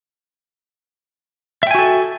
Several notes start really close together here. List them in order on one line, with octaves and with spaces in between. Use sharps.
E5 G5 G#5 F#4 A4